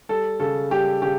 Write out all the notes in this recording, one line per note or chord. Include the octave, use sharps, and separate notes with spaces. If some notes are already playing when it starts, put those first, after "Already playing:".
G3 A4
C#3 A4
G3 G4
C#3 G4